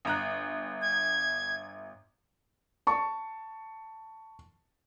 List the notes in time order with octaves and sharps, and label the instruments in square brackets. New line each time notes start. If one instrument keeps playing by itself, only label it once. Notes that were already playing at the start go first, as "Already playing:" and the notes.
[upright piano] G1 A#5 F#6
[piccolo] G#6
[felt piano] A5 C#6